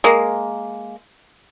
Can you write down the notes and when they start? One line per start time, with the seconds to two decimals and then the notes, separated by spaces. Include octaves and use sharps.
0.04 G#3 A#3